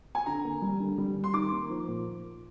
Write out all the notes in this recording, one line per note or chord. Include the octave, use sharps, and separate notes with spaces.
G#5
D3 A#5
A#3
G3
D3
G3
G3
C6
D#3 D6
A#3
F3
A#2